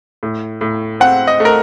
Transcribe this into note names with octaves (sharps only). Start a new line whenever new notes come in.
A2
A2
C4 F#5
D#5
A3
A#4